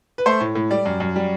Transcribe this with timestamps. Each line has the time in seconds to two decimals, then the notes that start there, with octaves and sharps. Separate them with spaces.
0.18 B4
0.26 A3 C5
0.40 A2
0.55 A2
0.71 G3 D5
0.86 F#2
1.00 F#2
1.16 G3